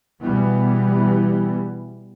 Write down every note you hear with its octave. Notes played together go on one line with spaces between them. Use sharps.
B2 E3 G3 B3